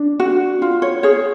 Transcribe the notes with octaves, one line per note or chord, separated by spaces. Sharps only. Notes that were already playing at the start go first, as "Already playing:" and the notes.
Already playing: D4
F#4
F4
C#5
G#4 C#5